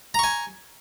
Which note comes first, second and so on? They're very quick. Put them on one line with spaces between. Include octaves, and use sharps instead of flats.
A#5 C#6 G#5